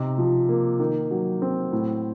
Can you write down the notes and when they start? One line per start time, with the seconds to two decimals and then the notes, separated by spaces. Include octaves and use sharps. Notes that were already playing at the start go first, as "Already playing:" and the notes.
Already playing: C3 D#4
0.18 F3
0.49 A#3
0.80 D#3
1.11 F#3
1.42 C4
1.72 A2